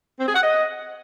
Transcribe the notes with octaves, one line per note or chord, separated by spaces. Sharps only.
C4
G#4
F#5
D#5